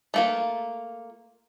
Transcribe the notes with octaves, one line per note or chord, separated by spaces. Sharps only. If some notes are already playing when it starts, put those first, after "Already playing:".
A3 A#3 F4